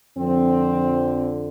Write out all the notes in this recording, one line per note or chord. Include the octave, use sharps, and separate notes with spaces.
F2 D3 F3 C4